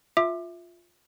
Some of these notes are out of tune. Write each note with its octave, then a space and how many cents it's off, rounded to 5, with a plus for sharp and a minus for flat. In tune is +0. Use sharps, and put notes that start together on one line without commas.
F4 +5 E5 +0 D6 +25